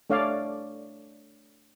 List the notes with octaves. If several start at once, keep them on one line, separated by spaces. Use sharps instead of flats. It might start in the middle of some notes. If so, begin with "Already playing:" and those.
A3 D4 C#5 D5 F5